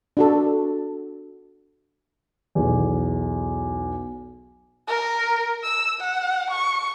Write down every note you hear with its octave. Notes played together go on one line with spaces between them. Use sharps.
D4 F#4 A4
B1 E2
A#4
E6
F#5
C#6